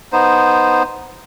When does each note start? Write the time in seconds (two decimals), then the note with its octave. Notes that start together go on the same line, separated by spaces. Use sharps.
0.13 B3 D#4 C5